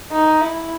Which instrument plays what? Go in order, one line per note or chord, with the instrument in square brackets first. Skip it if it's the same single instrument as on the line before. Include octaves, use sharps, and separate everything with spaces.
[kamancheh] D#4
E4